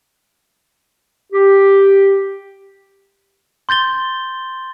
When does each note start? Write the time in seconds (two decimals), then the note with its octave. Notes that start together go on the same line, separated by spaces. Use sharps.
1.33 G4
3.69 C6 G6 A6 G7